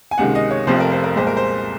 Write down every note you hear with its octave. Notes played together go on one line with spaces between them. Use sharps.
G#5
C#2 C3 D#3 G#3 F#5
D#5
C#5
F1 F2 C3 F3 C5
A#4
C5
A#4
C2 A#2 G#3 C5
A#4
C5